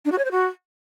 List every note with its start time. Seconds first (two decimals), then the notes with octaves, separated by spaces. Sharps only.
0.05 D4
0.12 F#4
0.18 C#5
0.25 C5
0.31 F#4